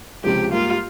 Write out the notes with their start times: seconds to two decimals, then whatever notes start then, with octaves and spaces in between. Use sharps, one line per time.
0.24 C#2 C3 F3 G#3 G4
0.52 G#2 G3 A#3 F4